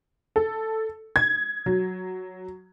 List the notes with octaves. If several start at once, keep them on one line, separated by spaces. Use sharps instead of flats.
A4
G#6
F#3